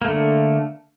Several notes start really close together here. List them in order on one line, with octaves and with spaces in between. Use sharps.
A#3 A3 D3